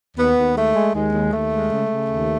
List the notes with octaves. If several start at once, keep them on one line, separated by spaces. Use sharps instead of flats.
D#2 B3
D#2
G#3 A3
G#3
D#2 G#3
D#2
D#2 A3
G#3
C#3
C#3
D#2